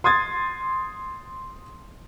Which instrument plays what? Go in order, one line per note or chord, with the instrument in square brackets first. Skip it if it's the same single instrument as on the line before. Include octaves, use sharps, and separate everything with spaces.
[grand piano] C6 D#6 G#6 A6